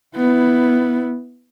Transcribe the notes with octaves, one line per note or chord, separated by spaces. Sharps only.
B3 E4